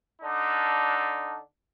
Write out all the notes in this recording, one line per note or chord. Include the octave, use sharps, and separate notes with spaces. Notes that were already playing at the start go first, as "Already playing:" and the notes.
D3 D4 D#4